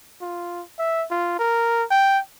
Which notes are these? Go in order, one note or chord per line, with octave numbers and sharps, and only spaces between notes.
F4
E5
F4
A#4
G5